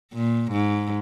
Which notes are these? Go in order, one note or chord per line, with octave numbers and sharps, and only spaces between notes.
A#2
G#2